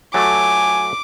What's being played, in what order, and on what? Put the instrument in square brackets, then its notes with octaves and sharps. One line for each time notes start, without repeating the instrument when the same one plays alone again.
[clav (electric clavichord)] F#3 A3 A4 [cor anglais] G#5 [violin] D6